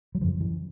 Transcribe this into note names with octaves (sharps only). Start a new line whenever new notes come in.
F#3
F#2 C#3 F3
E3